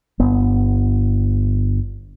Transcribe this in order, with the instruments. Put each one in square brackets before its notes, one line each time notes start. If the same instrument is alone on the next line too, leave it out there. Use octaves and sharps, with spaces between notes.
[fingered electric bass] G1 B3